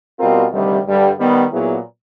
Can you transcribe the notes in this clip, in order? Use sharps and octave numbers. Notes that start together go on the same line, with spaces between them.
B2 G3 C4 F4 A#4
D2 C3 D#3 G3
G2 D3 G3
D#3 G3 B3
A#2 F#3 B3 E4 G#4